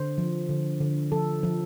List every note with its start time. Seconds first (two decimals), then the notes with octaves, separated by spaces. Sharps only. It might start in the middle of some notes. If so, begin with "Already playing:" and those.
Already playing: D3 C5
0.18 F3
0.49 D3
0.81 D3
1.12 F3 A4
1.43 F3